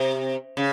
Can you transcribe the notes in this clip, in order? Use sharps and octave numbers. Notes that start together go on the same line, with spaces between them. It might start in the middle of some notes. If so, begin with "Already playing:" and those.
Already playing: C3
C#3